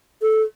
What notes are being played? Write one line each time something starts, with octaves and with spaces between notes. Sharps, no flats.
A4